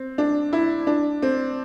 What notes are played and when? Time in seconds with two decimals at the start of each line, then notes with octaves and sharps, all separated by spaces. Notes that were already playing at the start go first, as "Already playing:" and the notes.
Already playing: C4
0.18 D4
0.53 E4
0.87 D4
1.22 C4